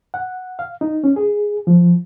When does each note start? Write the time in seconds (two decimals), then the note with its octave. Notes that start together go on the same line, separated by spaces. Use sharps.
0.14 F#5
0.59 F5
0.81 D#4
1.04 C#4
1.16 G#4
1.67 F3